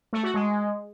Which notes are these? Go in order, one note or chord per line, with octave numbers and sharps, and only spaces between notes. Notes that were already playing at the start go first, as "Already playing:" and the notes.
A3
F#4
G#3